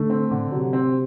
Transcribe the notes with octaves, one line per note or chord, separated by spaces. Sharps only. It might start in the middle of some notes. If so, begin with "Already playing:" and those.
Already playing: D3 A3
C4
D3
C3 F#3
C4